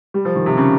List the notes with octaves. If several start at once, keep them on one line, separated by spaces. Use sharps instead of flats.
G3
F3
D#3
C3
C#3